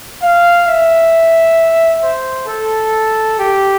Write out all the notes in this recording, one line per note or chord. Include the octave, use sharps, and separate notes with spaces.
F5
E5
C5
A4
G4